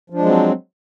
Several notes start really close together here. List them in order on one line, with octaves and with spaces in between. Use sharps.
F3 D4 G#3 F#3 C4